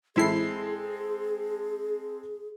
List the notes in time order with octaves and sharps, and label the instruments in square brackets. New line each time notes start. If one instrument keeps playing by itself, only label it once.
[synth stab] A1 E4 C7 [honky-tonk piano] G#3 C4 A4 [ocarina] G#4